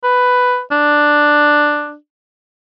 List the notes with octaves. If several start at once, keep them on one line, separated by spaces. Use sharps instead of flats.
B4
D4